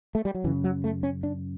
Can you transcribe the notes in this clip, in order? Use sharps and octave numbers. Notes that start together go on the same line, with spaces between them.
A3
G3
F#3
F#2 C#3 E3
F#3
A3
C#4
D4